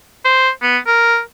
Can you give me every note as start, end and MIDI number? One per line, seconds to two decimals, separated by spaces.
0.25 0.50 72
0.63 0.78 59
0.87 1.20 70